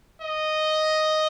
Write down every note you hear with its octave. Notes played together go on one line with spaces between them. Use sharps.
D#5